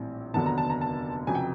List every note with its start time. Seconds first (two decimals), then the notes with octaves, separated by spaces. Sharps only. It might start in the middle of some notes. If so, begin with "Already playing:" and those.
Already playing: A#1 A2 E3 G3 C4
0.34 F1 D#2 D3 F#3 B3 A5
0.46 A#5
0.58 A5
0.70 A#5
0.81 A5
1.27 F1 F2 C#3 F#3 G#5
1.35 G5